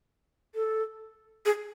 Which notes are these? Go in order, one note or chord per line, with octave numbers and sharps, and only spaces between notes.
A4
G#4